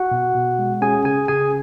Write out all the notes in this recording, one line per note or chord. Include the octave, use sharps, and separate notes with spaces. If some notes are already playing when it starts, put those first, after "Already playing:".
Already playing: F#4 F#5
B2
B2
G#3
C#4 G#4 G#5
C#3 G#4 G#5
C#3 G#4 G#5